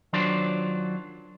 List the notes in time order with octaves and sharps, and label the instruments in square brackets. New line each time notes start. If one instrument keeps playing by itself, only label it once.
[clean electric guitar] D#3 F#3 D4 F4 C5 D5